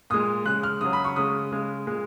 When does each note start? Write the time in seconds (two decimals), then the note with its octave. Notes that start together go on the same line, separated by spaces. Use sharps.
0.10 A#2 G#3 D#6
0.45 C#3 G#3 F#6
0.63 F6
0.81 C#3 F#3 D#6
0.93 B5
1.04 C#6
1.16 C#3 G#3 D#6
1.51 C#3 G#3
1.86 A#2 G#3